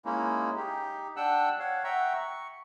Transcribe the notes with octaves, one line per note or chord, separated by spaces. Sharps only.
G#3 A#3 C#4 D#4 E4
D#4 G4
D4 F#5 G5 E6 F#6
C#5 F5 F#5
E5 F#5 G5 A#5 C#6
C#6